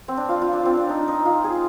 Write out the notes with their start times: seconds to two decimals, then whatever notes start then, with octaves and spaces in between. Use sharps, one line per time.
0.08 C4
0.17 D4
0.29 F4
0.42 F4
0.53 D4
0.66 C4
0.77 D4
0.89 D#4
1.08 D#4
1.25 F4
1.44 G#4